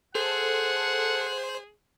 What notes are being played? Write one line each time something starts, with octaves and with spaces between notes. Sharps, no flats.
G#4 A4 C5 F#5